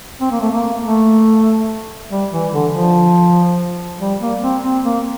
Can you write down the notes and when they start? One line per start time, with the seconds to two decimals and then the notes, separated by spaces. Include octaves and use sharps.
0.21 C4
0.31 A#3
0.41 A3
0.51 A#3
0.84 A3
2.11 G3
2.32 E3
2.52 D3
2.74 F3
4.00 G3
4.21 A#3
4.42 C4
4.63 C4
4.84 A#3